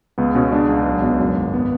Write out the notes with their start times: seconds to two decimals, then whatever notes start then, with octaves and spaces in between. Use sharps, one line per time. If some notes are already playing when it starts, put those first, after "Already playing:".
0.18 C#2 B3
0.35 B2 C#4
0.52 G#3 D4
0.69 C#2
0.86 B1
1.02 B2
1.20 F#2
1.37 G#1
1.54 B3